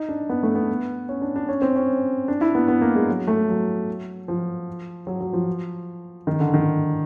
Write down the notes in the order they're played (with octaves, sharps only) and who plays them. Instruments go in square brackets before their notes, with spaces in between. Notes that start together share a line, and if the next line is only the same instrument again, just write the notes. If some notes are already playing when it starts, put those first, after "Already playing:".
Already playing: [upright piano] D#4
D4
B3
A3
B3
C#4
D4
D4
C#4
C4
C#4
D4
E4
B3
B3
A#3
G#3
F#3
A3
F#3
F3
F#3
F#3
F3
D#3
D3
D#3